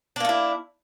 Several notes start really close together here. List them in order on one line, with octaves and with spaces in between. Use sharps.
D4 A#3 A3 E4